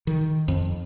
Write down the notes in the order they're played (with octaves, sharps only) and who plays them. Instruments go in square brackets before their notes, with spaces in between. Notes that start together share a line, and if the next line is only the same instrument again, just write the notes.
[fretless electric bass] D#3
F2